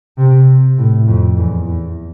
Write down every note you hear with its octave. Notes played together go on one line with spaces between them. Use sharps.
C3
A2
F2
E2
E2